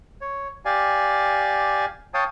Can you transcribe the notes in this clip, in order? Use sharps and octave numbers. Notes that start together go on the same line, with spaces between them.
C#5
G4 D5 F5 G#5
C#5 F5 G5 A5 D#6